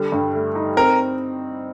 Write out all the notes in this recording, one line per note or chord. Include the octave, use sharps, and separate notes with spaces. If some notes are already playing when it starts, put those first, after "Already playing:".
Already playing: D3 G3
G2
A3
D#4
C4 A#4